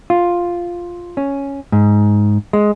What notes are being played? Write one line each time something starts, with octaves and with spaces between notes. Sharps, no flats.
F4
C#4
G#2
G#3